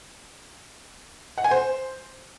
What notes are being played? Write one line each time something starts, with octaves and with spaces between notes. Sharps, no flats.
F#5
G#5
C5